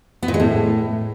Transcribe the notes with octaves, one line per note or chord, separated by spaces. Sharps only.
B3
A#2
G#3
A2